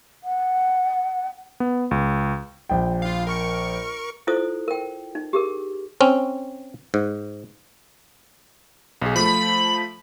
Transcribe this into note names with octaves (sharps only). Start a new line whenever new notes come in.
F#5
B3
C#2
A#1 G5
F4 F5
A#4 C#6 C#7
E4 F4 A4 C5 D#6
A#4 G5
D#4
G4 G#4 A#4
C4 C#4
G#2
B1 G#4
F3 A3 B5